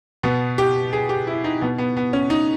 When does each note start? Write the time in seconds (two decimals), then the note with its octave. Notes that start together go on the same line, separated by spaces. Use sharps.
0.23 B2 B3
0.58 G4
0.93 G#4
1.09 G4
1.27 E4
1.44 D#4
1.61 B2 B3
1.78 B3
1.97 B3
2.13 C#4
2.30 D#4